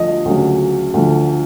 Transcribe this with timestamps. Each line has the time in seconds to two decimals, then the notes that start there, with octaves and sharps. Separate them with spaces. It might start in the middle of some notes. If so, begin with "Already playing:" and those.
Already playing: D2 D3 F3 D#5
0.25 D2 C#3 F#3
0.94 D2 D3 F3